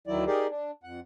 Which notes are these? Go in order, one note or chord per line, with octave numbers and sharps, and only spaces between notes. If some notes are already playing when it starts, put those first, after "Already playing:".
D2 D#3 F#3 E4 D5
D#4 G4 G#4 A#4 D5
D4
F2 F#5